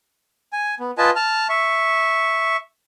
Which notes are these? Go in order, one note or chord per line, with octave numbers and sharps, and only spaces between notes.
G#5
B3
F4 B4 D#5 G#5 A5
A5 F6
E5 C#6